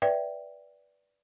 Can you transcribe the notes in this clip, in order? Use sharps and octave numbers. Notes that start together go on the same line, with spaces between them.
B4 D5 E5 G5